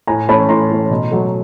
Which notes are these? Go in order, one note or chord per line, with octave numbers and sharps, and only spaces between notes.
A2 G#5 A#5
E3 A3 C#4 A5 B5
A2 A#5 C6
E3 A3 C#4
B2
F#3 A3